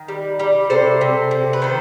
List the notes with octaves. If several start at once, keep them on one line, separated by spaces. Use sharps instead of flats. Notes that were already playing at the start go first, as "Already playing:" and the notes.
Already playing: D#3
G3
G3
C3 A4 C5
C3
C3
B4
D#3 A4 C5